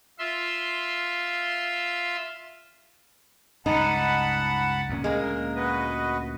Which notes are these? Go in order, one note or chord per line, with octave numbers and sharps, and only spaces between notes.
F4 E5 C6
C#2 G2 D#4 F#5 A5 B5
D2 A#2 C#4
G#3 A#3 A#4
F#4 B4 D#5